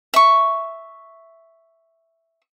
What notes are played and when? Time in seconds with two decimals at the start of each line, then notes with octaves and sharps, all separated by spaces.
0.14 E5 C#6